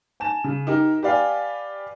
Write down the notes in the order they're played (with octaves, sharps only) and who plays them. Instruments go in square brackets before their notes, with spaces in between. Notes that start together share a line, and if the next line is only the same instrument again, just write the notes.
[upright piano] G#5 A5 E7
C#3
D#4 G4 A#4
G4 B4 D5 F5 G5 G#5